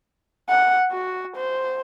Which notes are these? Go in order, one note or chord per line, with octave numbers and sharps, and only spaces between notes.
F#5
F#4
C5